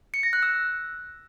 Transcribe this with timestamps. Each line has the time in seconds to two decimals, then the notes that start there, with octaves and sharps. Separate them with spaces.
0.14 C#7
0.23 A#6
0.33 F#6
0.43 E6